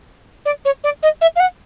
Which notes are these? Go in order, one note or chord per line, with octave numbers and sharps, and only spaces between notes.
D5
C#5
D5
D#5
E5
F5
F#5